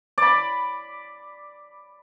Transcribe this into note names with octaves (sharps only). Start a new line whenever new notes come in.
D5 B5